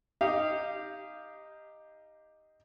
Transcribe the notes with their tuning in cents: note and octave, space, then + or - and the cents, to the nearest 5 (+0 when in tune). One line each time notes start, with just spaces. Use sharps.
D#4 +0 G4 +10 F5 -20